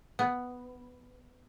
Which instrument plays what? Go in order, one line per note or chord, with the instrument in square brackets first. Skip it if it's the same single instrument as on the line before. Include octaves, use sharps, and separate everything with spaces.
[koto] B3